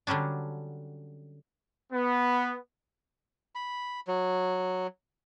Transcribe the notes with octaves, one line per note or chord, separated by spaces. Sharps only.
D3 F#3 G3 C#4 D4
B3
B5
F#3